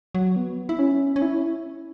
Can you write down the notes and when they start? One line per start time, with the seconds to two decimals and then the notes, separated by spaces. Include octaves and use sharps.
0.15 F#3
0.36 B3
0.69 E4
0.79 C#4
1.16 C#4
1.22 E4